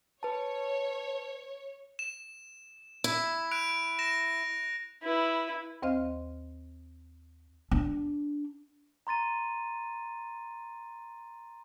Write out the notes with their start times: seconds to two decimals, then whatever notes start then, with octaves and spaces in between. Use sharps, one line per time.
0.23 B4 C#5 A5
1.99 E7
3.04 E4
3.51 F#6 D7 F7
3.99 A#6 E7
5.02 E4 B4
5.82 D#2 C4 C5 D#5 F5 F6
7.71 D4
9.07 A#5 C6 A6 D#7